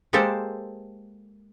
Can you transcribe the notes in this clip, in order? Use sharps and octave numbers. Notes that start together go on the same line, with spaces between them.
G#3 A#3 G4 A4 C5